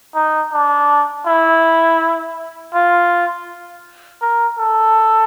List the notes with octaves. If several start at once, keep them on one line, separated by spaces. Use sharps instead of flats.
D#4
D4
E4
F4
A#4
A4